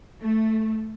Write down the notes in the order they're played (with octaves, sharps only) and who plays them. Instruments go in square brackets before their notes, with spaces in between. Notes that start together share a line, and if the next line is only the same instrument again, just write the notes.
[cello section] A3